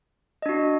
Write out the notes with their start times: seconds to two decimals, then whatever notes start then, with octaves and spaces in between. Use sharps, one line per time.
0.42 D#5
0.46 D4
0.49 F#4